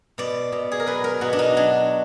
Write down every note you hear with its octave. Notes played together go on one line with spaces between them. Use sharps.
B2 D5
B2
G#4
A#4
F#3 B4
A#4
B2 F#4
D4
D#4
F#3 D4